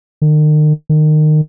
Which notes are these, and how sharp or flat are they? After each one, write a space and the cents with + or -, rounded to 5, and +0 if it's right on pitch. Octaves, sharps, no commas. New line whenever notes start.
D#3 -40
D#3 -25